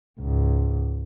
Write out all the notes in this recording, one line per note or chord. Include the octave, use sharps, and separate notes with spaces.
C#2 G#2